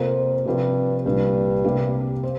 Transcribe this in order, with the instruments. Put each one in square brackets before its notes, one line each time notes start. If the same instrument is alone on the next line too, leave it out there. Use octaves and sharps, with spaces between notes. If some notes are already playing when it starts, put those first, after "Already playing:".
Already playing: [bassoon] F2 [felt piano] C3 A#3 F4 A#4
[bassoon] G2 [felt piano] C3 F3 C4 G4
[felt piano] C2 A#2 G3 D4 [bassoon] G2
[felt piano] C3 A#3 D4 G4
C5